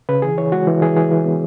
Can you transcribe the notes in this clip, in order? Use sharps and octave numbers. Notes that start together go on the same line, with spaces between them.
C#3 B4
E3 G#4
E3 C#5
G#3 F#4
E3
E3 G#4
E3 G#4
E3
B3